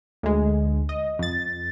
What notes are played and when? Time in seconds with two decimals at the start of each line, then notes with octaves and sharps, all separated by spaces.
0.23 D2 G#3
0.89 D#5
1.19 F2 A6